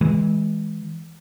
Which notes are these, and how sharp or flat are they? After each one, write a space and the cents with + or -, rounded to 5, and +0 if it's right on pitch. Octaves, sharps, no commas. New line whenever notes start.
E3 -25 G#3 +0